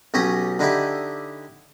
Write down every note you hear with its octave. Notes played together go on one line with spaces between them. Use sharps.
B1 C#4 G4 A#5 D#6
D3 D#4 E4 G4